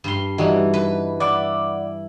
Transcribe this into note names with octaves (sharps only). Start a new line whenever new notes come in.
G2 C6
E3 G3 D#4 F#4
B4
E4 D5 F#5 D6